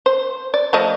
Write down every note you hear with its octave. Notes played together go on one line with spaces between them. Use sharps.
C5
D5
F3 A3 D#5